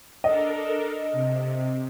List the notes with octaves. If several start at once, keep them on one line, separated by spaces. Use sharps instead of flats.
D4 A4 A#4 D#5
C3